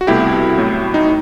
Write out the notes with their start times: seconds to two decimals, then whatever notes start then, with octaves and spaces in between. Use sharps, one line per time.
0.01 F#4
0.07 C2 B2 A3 E4 G4
0.58 A2 F#3 A3
0.94 D#4